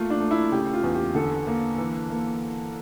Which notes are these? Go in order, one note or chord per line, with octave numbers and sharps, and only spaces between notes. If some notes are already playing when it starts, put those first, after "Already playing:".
Already playing: A3 A#3 F4
D4
A3
E4
C#3 G4
F4
E2
G4
D3 A4
A#3
E3
A#3